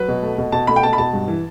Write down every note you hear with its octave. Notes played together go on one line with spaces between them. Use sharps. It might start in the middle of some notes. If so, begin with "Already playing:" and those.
Already playing: F#3 B4
B2
A3
B2
B2 A5
A3 B5
G5
B2 A5
B5
B2 A5
G2
E3